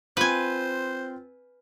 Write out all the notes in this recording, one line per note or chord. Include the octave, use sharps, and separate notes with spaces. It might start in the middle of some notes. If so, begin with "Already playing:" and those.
C4 F4 B4 C5 G#5